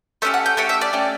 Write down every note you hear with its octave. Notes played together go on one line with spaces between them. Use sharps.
A3 C#4 G4 E5
F#5
G5
A3 C#4 G4 F#5
E5
D5
A3 C#4 G4